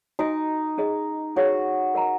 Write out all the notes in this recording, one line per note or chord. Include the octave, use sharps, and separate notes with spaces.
D#4 F#4 D#5 G#5
C#4 G#4 D#5
C#4 F#4 G#4 C#5 F#5
A#4 D#5 F#5 A#5